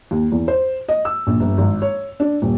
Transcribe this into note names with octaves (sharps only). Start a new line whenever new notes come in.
D#2
E2
C5
D#5
E6
A#1
G1
G#1
C#5
D4
D#1